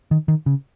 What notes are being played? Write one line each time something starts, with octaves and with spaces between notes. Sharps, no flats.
D#3
D#3
C#3